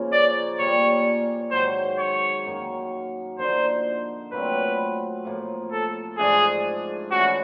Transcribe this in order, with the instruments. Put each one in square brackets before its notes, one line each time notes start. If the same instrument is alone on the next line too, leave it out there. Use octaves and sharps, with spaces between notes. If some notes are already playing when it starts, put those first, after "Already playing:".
Already playing: [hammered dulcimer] C#3 F3 A#3 C#4
[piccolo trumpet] D5
[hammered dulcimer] A#2 G3 A#3 [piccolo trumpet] C#5
[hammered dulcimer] G#2 D#3 F#3 [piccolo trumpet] C5
[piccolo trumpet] C#5
[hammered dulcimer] F#2 D#3 F#3 A#3
[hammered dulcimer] D3 F3 A#3 D#4 [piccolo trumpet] C5
[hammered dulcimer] A#2 F#3 A3 C4 [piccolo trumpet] B4
[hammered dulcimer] A2 F3 A#3
[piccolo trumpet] A4
[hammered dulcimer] G#2 F3 A3 D4 [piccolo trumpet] G#4
[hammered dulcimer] E3 A3 C#4 [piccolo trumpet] F#4